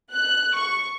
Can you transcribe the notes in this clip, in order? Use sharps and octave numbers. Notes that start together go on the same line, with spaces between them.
F#6
C#6